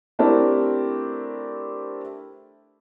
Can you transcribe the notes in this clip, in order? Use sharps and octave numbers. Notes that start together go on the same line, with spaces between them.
A3 C4 D4 E4 G4 A#4